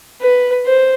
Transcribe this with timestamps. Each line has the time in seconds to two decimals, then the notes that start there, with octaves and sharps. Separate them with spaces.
0.21 B4
0.66 C5